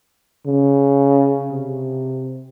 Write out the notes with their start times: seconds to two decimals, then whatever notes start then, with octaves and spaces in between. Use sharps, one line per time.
0.46 C#3
1.52 C3